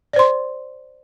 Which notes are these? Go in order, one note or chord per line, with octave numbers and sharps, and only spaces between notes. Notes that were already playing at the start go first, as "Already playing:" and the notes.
C5 D5 C6